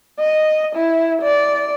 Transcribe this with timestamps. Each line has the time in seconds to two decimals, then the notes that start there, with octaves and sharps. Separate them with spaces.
0.20 D#5
0.75 E4
1.22 D5